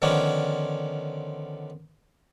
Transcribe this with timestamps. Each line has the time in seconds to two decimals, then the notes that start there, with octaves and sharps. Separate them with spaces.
0.02 D3 D#3 F3 B3 C#4 D4